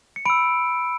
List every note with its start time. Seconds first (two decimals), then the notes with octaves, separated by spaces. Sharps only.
0.16 C#7
0.25 B5 E6 D7